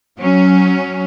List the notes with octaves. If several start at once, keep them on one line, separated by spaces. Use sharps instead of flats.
F#3 C#4